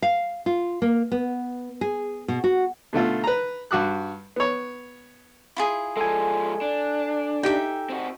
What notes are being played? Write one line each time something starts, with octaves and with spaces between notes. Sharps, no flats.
F5
F4
A#3
B3
G#4
B2
F#4
B2 D3 A3 F4
B4 A#5
G2 F#4 D6 F#6
B3 C#5
E4 F4 G#4
F3 G#3 A4 G#5
D4
D#4 G4 E5 G5
C4 F#4